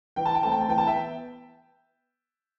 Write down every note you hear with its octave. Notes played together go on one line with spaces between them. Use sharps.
E3 G5
A5
G5
A3 C4 A5
G5
A5
E3 G5
A5
E5 G5
B3